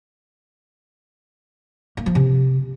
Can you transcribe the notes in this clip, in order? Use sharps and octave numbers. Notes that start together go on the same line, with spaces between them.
A#3
F3
C3